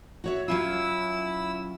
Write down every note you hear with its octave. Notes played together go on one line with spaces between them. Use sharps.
F#4 C#5 E5
F#3 C#4 E4 F4 E6